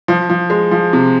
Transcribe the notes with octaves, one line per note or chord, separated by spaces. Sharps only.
F3
F3
G#3
F3
C3